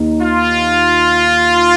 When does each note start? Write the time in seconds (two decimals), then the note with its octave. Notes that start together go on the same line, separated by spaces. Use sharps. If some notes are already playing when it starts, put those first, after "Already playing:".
Already playing: D#2 D#4
0.22 F4